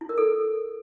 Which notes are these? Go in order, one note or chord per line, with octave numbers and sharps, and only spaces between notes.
E4
A#4
A4